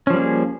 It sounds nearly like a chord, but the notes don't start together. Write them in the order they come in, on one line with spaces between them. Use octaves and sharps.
C#4 F3 G3 A#3 G#4